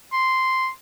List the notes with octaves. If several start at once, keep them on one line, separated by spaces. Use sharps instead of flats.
C6